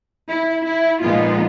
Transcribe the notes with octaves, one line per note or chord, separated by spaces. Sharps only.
E4
E4
A#2 F3 G#3 B3 D#4 F4